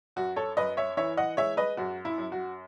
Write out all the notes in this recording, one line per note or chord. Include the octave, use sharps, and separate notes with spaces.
F#2 F#4
A4 C#5
F#2 B4 D#5
C#5 E5
E3 C#5 E5
D#5 F#5
G#3 C#5 E5
B4 D#5
F#2 F#4
E4
F#2
F#4